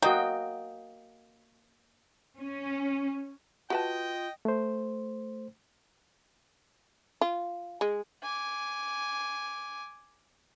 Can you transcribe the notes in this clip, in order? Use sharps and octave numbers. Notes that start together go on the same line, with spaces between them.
A#3 F#4 D#5 G5
C#4
F4 F#4 B4 D#5 G5 A5
A3 C5
F4
G#3
G#5 D6